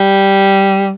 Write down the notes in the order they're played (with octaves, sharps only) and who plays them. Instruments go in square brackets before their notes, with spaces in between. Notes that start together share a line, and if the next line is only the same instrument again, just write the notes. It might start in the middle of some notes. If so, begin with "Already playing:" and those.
Already playing: [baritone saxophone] G3